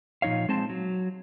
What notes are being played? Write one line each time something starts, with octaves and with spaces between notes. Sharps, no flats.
A#2 F3 D#4 C#5 F5
G#3 C4 C5 A5
F#3